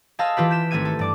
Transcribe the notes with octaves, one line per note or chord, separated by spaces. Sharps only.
G#4 C5 D#5 F5 A5 E6
E3 F4 G4 B4
G6 B6 E7
G#1 A3 C4 E5 G#6 D#7
A4
G2 D5 D6